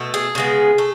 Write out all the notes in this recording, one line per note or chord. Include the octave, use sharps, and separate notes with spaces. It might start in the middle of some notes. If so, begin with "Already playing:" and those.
Already playing: B2 A3
G#4
C#3 G#3 B3
A3